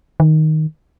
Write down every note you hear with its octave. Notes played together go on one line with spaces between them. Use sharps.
D#3